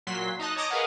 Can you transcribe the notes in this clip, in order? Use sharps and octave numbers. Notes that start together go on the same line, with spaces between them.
A#2 F#3 C6 B6
D#4 D#5 A5 F#6
C#5 D#5 A5 A#5 D6 D#6
G#4 A#4 B4 D#5 F5 F#5